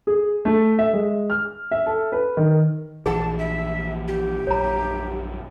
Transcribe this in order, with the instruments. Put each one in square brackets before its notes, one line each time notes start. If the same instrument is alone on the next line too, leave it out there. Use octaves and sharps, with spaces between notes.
[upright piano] G#4
A3
E5
G#3
F6
E5
A4
B4
D#3
[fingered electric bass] A#1 E3 [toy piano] G#4 F#5 [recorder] A5
[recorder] E5
G4
[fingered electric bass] A#1 F#2 [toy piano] C#5 A#5